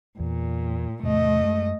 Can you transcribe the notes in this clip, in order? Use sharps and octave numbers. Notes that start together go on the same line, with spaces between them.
E2 A#2
E2 A2 C3 A3 D#5
F#2 G#3